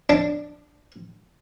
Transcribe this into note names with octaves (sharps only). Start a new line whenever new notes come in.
D4